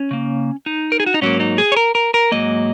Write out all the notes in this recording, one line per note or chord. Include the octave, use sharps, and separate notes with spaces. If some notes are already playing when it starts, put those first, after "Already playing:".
Already playing: C#4
C#3 A#3
D#4
A#4
G#4
F#4
D#4
G#2 F#3 A#3 C#4
D#4
G#4
C#5
A#4
A#4
A#4
G#2 F#3 A#3 D#5